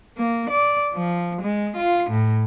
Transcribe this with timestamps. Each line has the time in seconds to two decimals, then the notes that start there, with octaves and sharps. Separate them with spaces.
0.17 A#3
0.50 D5
0.94 F3
1.41 G#3
1.77 F4
2.10 A2